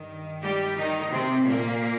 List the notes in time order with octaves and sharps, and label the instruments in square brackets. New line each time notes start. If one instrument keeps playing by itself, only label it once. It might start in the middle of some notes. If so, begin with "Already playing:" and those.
Already playing: [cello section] G2 D#3
G3 G4
D#3 D#4
C3 C4
A#2 A#3